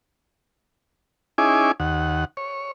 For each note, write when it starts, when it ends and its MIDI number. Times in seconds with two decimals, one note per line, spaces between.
1.38 1.72 61
1.38 1.72 63
1.38 1.72 64
1.38 1.72 68
1.38 1.72 80
1.38 1.72 86
1.80 2.25 39
1.80 2.25 78
2.37 2.71 73